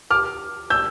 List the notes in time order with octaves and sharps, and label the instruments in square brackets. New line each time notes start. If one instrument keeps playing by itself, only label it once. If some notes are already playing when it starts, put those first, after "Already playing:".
[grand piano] D6 F6
E6 G6